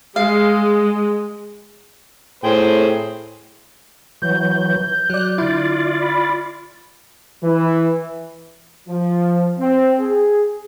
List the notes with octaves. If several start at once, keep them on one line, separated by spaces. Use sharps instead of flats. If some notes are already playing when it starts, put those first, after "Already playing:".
G#3 F5
A2 G#4 C5 G5
E3 F#3 G6
F#3 D5 F#6
D3 E4 F4 D5
B5
E3
F3
C4
G#4